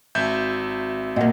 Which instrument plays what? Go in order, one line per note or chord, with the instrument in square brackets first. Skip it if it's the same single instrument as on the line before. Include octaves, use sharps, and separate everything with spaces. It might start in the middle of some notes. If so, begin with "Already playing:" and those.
[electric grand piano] G#1 E5 G6 [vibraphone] C4 F#4 G#5
[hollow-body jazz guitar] A#2 A#3 [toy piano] D#5 F#5